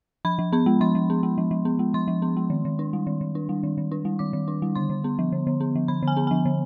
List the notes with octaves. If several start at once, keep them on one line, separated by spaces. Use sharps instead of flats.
F3 B5
F3
B3 B5
G#3
F3 C6
F3
B3
G#3
F3
F3
B3
G#3
F3 C6
F3
B3
G#3
D#3
D#3
D4
G3
D#3
D#3
D4
G3
D#3
D#3
D4
G3
D#3 D6
D#3
D4
G3
D3 C6
D3
B3
F3
D3
D3
B3
F3
D3 B5
D3
G#5
B3
F3 G#5
D3